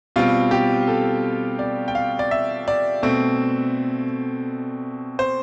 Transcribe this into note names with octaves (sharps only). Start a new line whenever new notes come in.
B2 G3 C4 F4
G4
A4
D5
G5
F5
D5
E5
D5
B2 A3 C4
C5